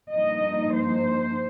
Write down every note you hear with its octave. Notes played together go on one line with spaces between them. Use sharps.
G2 F3 A#3 D#4 D#5
C5